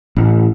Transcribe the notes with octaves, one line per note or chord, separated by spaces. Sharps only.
A1